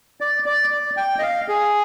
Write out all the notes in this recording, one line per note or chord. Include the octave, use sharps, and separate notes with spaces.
D5
D5
D5
G5
D#5
F5
G#4